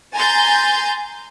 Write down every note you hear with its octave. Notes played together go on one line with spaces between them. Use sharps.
G#5 A#5 C6 G6 A6